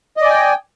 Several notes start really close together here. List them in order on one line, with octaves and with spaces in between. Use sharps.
D#5 D5 G#5 G5